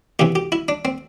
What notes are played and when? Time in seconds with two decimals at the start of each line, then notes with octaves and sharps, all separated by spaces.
0.19 E2 C3 E3 G4
0.35 G4
0.52 E4
0.68 D4
0.85 C4